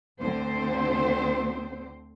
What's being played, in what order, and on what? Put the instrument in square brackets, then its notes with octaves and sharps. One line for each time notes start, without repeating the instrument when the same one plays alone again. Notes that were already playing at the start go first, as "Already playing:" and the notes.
[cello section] D2 D3 C4 C5